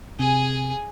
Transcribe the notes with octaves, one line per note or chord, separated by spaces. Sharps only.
C3 G#4 G#5